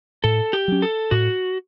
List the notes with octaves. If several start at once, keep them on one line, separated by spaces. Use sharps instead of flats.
A2 A4
G4
F#3 C#4
A4
A2 F#4